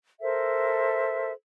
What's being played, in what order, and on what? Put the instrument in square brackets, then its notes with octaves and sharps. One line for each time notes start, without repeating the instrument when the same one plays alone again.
[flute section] A4 A#4 C5 E5